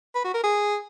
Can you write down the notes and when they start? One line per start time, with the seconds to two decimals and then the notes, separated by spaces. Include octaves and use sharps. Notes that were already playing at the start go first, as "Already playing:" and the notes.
0.15 B4
0.24 F#4
0.34 A#4
0.43 G#4